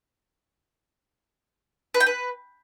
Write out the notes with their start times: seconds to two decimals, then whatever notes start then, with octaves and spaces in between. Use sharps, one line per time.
1.94 B4
2.00 G5
2.06 B4